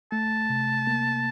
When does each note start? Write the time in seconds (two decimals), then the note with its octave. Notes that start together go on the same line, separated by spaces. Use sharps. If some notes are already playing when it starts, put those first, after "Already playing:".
0.12 A3 A5
0.50 C3
0.87 A#3